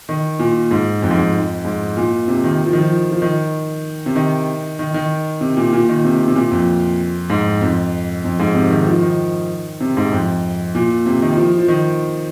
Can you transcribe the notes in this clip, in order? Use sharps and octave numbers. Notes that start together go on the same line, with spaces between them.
D#3
A#2
G#2
F2
G#2
F2
G#2
A#2
C3
D#3
F3
D#3
F3
F3
D#3
C3
D#3
D#3
D#3
C3
A#2
A#2
D#3
C3
C3
A#2
F2
G#2
F2
F2
G#2
C3
D#3
F3
D#3
C3
G#2
F2
A#2
C3
D#3
F3
F3
D#3